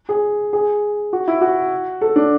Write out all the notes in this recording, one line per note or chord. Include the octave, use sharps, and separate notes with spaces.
G#4
G#4
F#4
E4
F#4
A4
D4